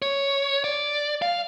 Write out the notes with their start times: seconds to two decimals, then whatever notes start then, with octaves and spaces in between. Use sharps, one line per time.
0.02 C#5
0.64 D5
1.22 F5